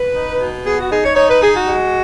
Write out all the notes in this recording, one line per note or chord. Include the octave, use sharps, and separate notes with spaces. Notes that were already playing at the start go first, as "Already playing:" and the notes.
Already playing: B4
D#4
B2
B3 G#4
F#4
D#4 G#4
C#5
D#4 C#5
B4
D#4 G#4
F#4
G#3